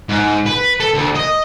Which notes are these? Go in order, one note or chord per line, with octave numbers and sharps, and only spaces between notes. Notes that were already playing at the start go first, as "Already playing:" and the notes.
G#2
B4
A4
D2
D#5